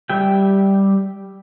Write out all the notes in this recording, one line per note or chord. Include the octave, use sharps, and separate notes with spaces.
G3 G4 E5 G5